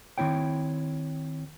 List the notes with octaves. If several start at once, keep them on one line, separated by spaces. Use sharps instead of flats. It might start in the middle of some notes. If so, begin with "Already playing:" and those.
D#3 C4 E4 C#5 G5